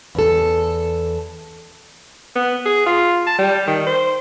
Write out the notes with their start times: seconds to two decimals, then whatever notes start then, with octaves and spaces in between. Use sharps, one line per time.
0.15 E2 A4
2.36 B3
2.66 G#4
2.86 F4
3.27 A5
3.39 G3
3.67 D#3
3.87 C5